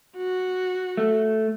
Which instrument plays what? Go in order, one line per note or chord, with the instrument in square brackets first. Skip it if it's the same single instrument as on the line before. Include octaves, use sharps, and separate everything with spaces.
[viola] F#4
[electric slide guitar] A3